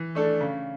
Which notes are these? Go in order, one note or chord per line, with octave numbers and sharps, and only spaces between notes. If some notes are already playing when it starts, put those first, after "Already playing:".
Already playing: E3
A3 D4 A4
C#3